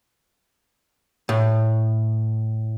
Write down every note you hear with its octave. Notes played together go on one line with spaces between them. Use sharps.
A2